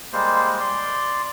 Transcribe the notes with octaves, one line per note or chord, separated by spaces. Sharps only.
G3 G#3 A#3 C5
D5 C6